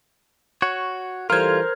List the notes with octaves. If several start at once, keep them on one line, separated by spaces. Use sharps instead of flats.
F#4 C#5
E3 G3 F4 A4 A#4 C5 F6 G#6